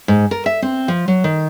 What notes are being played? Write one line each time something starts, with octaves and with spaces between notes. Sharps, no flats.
G#2
A#4
E5
C4
F3
F#3
D#3